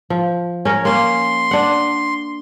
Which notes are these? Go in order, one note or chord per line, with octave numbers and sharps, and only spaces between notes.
F3
C#4 A#4 C#5
A#3 C#4 C6
D4 F#5